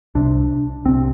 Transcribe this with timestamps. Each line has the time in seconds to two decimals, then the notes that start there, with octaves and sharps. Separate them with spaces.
0.15 C2 C3 D4
0.85 C2 C3 C4